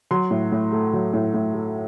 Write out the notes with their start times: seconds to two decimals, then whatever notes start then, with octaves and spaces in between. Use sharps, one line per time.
0.11 F#3 C6
0.31 A2
0.52 A2
0.72 A3
0.93 F#3
1.14 A2
1.34 A2
1.54 A3